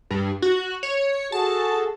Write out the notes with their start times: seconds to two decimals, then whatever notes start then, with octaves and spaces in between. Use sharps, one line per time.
0.10 G2
0.42 F#4
0.83 C#5
1.32 F#4 G#4 A4 A5